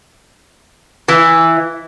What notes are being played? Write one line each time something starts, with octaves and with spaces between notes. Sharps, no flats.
E3